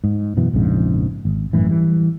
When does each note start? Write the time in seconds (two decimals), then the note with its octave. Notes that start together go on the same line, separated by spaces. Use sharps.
0.04 G#2
0.37 F#2 B2 E3
0.53 A#1 F2 G#2 C#3
1.25 G#1
1.53 G#1 F#2 A2 E3
1.69 E3 G3